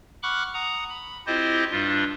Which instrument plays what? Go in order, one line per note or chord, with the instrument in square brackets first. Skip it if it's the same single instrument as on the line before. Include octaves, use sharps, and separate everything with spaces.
[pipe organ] F#5 B5 C#6 D6 F6 F#6
F#5 A#5 D#6
B5
C4 E4 F4 G4 C5 D#5
G2 G3 D4 F4